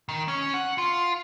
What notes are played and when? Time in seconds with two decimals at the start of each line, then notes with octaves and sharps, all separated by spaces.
0.09 D#3
0.28 C#4
0.54 F#5
0.78 F4